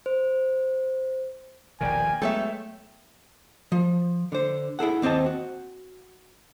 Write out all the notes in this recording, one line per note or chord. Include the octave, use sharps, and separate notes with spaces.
C5
D#1 A#1 B2 A#4 D5 G5 G#5
F#3 G#3 A3 B3 A4 C#5 E5 G5
F3
D3 C5
E4 G#4 A4 F#5
D#2 C4 C5 D#5 A5
F#4